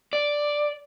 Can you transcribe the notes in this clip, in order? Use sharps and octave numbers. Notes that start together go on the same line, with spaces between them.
D5